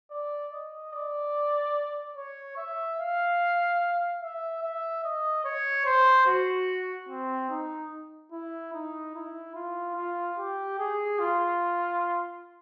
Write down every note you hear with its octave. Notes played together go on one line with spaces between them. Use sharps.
D5
D#5
D5
C#5
E5
F5
E5
E5
D#5
C#5
C5
F#4
C4
D#4
E4
D#4
E4
F4
F4
G4
G#4
F4